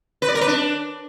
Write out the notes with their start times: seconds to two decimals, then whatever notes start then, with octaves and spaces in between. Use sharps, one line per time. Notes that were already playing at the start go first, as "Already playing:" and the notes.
0.22 B4
0.28 D5
0.35 A#4
0.41 B4
0.48 D4